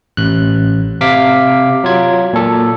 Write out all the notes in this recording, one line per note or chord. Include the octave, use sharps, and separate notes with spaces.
A1 F#6
C3 F5 D6 B6
F#3 F4 G#6
A#2 A4